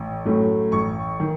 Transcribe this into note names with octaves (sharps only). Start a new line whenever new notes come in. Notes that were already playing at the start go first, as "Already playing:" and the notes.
Already playing: A1
A2 F#3 A3 C#4
A1 C#6
D#3